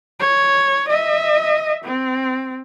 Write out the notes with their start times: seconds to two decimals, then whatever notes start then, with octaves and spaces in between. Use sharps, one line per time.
0.20 C#5
0.88 D#5 E5
1.84 C4